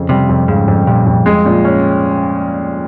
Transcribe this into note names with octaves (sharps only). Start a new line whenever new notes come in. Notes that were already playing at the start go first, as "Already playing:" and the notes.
Already playing: F2 C#3
C3 G3
F2
G#2 C#3
F2
A#2 G3
F2
G#3
A#2
C#4